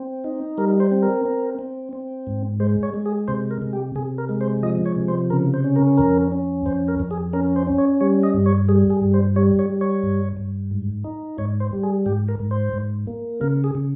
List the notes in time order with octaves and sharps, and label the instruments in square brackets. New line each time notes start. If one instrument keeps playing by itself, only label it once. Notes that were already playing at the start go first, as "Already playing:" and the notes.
Already playing: [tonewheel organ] C4
D#4
G3 A#4
C5
C4
A#4
C4
C4
C4
G#2
G#3 C5
C#5
G#3
G#4
C3 C5
A#4
C3
G4
C3 G#4
A#4
G#3
C5
F3 D#5
C#5
C3
C5
C#3 A#4
C5
C#4
A#4
F2 A#4
C#4
F2 C5
A#4
F2
G#4
C#4 A#4
C5
C#4
C#5
G3 C#5
D#5
G2
C#5
G3 G#4
G#4
G2
C5
G3 C#5
C#5
G3
C#5
G2
G2
G#2
D#4
G#2 C#5
C5
G3
G#4
G#2 G4
A#4
G#2
C5
G#2
A#3
C#3 A#4
G#4
C#3